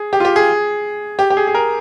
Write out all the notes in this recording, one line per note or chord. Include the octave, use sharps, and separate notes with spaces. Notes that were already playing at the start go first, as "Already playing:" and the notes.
Already playing: G#4
G4
F4
G4
G#4
G4
G4
G#4
G#4
A#4